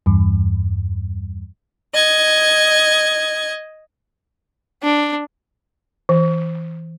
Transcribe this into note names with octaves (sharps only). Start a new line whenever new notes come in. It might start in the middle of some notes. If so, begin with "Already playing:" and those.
E2 G2
D#5 G#6
D4
E3